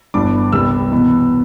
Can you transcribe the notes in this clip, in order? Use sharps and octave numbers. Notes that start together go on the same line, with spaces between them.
G1 G2 E3 B3 D4 D6
C2 C3 G3 B3 E6
E2 B2 B3